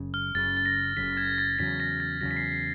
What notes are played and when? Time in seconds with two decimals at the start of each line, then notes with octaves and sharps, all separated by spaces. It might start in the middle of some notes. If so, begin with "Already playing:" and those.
Already playing: F#1 F#2 C#3
0.14 F6
0.35 F#1 F#2 C#3 A6
0.57 A6
0.66 A#6
0.96 F#1 F#2 C#3 B6
1.17 G#6
1.38 A6
1.59 E2 C#3 F#3 B6
1.80 A#6
2.00 A6
2.21 E2 C#3 F#3 A#6
2.31 B6
2.37 C7
2.52 C7